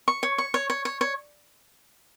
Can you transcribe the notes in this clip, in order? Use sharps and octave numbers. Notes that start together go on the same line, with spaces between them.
C#6
C#5
C#6
C#5
C#5
C#5
C#5